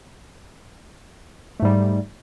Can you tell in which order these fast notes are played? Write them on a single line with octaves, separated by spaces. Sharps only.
A3 G#2 G3